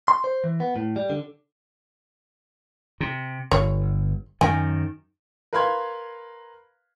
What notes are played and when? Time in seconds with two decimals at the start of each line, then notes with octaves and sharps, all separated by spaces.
0.08 C6
0.24 C5
0.44 E3
0.60 B3
0.76 A2
0.96 G3
1.10 D3
3.00 C3
3.51 G1 C#5
4.41 F#2 D#3 G#5
5.53 A#4 B4 F5 B5 C6 G#6